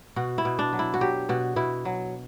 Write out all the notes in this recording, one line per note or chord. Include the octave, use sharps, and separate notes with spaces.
B2 F#4
E4
B2
D4
F#3
E4
F#4
F#3 G4
B2 F#4
B2 E4
F#3